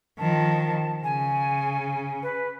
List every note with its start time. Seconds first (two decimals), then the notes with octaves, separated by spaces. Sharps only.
0.19 D#3 F3 A5
1.04 C#3 G#5
2.23 B4